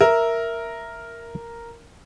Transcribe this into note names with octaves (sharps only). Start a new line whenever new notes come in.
A#4 E5